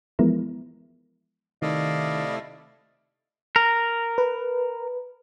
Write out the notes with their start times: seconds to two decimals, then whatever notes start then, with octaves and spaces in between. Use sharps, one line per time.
0.19 E3 F3 G#3 B3 E4 A#4
1.62 C3 D#3 A3 E4 D5 D#5 F5
3.56 A#4
4.18 B4